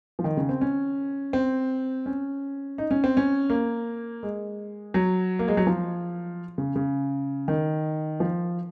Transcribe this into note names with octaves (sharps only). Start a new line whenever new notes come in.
F3
D#3
C#3
C4
C#4
C4
C#4
D#4
C#4
C4
C#4
A#3
G#3
F#3
A#3
G#3
F#3
F3
C#3
C#3
D#3
F3